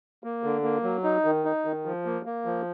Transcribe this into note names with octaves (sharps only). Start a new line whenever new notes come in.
A#3
D3
A#3
F#3
D#4
D#3
D#4
D#3
F3
A#3
A#3
F3